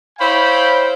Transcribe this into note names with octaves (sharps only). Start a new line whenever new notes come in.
E4 C5 C#5 F5 G5 B5